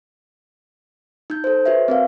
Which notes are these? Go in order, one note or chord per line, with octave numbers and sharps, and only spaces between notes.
D#4 G6
A4 C5
F#4 B4 C#5 E5
C4 A#4 F5